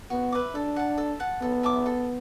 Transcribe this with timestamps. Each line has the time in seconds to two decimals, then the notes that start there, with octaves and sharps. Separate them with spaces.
0.10 B3 F#4
0.32 B4 E5 D6
0.54 D4 A4
0.76 F#5 A5
0.97 A4
1.20 F#5 A5
1.41 B3 A4
1.63 E5 A5 D6
1.86 A4